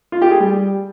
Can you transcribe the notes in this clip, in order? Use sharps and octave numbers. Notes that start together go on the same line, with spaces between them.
F4
G4
G#4
G3